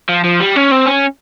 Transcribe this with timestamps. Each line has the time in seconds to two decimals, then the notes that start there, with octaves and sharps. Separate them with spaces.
0.09 F3
0.24 F3
0.40 G3
0.56 C#4
0.72 C4
0.86 C#4